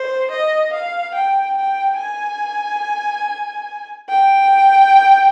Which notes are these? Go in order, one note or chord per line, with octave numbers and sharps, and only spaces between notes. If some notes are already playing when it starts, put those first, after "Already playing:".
Already playing: C5
D#5
F5
G5
G5
G#5
G5